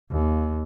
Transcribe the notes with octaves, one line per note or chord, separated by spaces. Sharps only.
D#2